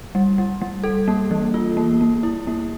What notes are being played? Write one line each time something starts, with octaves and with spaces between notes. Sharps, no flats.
G3
G3
G3
A4
A#3
E3
F4
A#3
A#3
E4
A#3